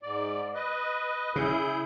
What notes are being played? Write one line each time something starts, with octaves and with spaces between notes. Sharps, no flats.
G#2 D5
B4 D#5
C#3 E4 G#4 G6